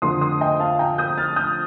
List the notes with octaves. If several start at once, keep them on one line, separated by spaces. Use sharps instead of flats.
F2 D3 A3 C6 D#6
C6 D#6
D#5 G5
F5 A5
G5 A#5
D#6 G6
F6 A6
D#6 G6